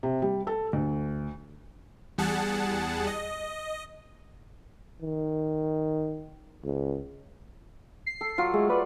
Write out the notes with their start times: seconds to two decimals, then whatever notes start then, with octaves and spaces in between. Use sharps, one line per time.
0.03 C3
0.22 G3
0.47 A4
0.73 D2
2.18 E2 G3 G#4 F#5 A5
3.07 D#5
5.02 D#3
6.64 C#2
8.06 C7
8.21 A4
8.38 F#3 F4
8.54 G#3 A3
8.70 B4 D5